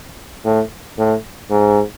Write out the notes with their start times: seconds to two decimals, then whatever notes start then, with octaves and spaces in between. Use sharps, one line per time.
0.45 A2
0.98 A2
1.51 G#2